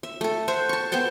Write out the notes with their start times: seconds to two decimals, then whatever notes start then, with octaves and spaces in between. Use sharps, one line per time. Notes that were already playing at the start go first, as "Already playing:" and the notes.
0.03 E5
0.21 A3 A4
0.48 C5 E5 F#5
0.69 A5 C#6
0.92 B3 C5 G5 A5